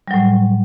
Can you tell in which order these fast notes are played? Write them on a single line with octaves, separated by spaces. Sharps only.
G3 F#3 A2